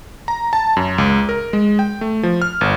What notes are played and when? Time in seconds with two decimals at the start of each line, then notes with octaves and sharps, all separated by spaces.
0.28 A#5
0.53 A5
0.77 F#2
0.98 C#2
1.29 A#4
1.53 G#3
1.79 G5
2.01 A3
2.23 F3
2.42 F6
2.61 G1